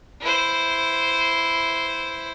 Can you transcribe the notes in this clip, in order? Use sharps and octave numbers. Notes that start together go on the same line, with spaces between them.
E4 C5